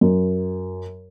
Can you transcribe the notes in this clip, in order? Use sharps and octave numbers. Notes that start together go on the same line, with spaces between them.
F#2